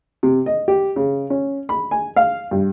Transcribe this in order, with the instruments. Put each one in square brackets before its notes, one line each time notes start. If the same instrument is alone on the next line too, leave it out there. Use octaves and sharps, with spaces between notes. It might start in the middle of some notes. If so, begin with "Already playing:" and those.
[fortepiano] C3
D#5
G4
C#3
C#4
B5
G#5
F5
G2